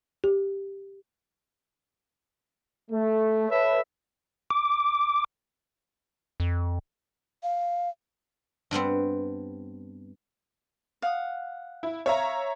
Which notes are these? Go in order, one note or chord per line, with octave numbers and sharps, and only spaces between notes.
G4
A3
A4 B4 C#5 E5
D6
F2
F5
G2 G3 B3 C4
F5 F#5 D#6
E4
C#5 E5 F5 A#5